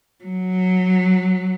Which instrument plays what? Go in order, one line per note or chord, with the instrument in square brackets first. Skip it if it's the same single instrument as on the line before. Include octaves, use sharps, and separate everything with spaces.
[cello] F#3